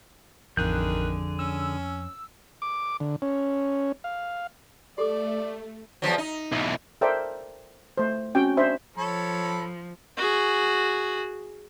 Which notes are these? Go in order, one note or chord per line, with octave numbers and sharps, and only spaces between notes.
A1 F2 D3 D#3 G#4 F#6 G6
C#4 E6
D6
D3
C#4
F5
A3 G4 A4 D5 D6
E2 F3 F#3
D#4
B1 E3
A4 A#4 C5 D5 E5 G5
A3 C5
C4 C#4 F#4 G5
D4 C5 E5 B5
F3 A4 C#5 B5
F#4 G#4